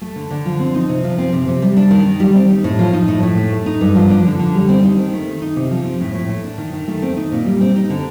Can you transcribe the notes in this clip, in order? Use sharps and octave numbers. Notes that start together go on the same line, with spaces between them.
A3
D3
D3
F3
C4
D#4
C3
F3
C4
C3
C3
G3
D4
D#3
D#3
G3
C4
D#4
A2
F3
D#4
A2
A2
A3
A3
D#4
G2
F3
D4
D3
D3
G3
C4
D#4
D#3
A3
C4
D#4
C3
F3
C4
A2
A2
A3
D4
D#3
D#3
A3
C4
D#4
A#2
G3
C4
D#4
D3